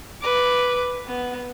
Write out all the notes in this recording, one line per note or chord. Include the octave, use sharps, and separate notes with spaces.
B4 D6
B3